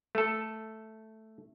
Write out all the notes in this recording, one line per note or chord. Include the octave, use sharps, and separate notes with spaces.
A3 A4